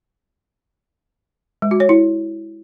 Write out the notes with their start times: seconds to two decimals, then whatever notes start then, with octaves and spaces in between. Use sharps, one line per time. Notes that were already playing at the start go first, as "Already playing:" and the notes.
1.62 G#3
1.71 F#4
1.80 C#5
1.89 E4